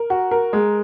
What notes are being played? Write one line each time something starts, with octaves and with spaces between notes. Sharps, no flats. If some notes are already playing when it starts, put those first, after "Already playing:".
Already playing: A#4
F#4
A#4
G#3